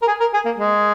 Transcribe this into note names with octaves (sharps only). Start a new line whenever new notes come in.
A#4
G#4
A#4
G#4
A#3
G#3